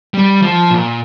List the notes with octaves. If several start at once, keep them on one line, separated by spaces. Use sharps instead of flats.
G3
F3
A#2